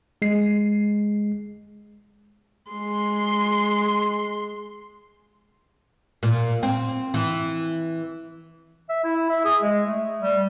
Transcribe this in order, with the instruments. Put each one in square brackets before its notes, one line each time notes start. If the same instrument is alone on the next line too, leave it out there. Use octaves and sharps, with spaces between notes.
[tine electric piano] G#3 C7
[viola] G#3 C6
[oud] A#2
C4
E3
[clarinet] E5
E4
E5
G#4
G#3
A3
G3